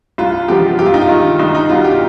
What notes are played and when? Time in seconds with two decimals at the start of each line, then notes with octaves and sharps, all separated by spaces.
0.18 C2 F4
0.48 C3 F3 G#3 B3 G4
0.79 G2 G4
0.86 F4
0.94 D#4
1.01 F4
1.09 D#3 G#3
1.39 C2 D#4
1.55 D#4
1.69 B2 G3 B3 F4
1.84 G4